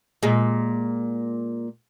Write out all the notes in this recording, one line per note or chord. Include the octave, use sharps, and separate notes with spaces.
A#2 G#3